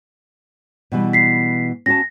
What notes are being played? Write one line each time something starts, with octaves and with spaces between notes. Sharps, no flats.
B2 E3 G3
B6 C7
C#4 F#4 A5 A#6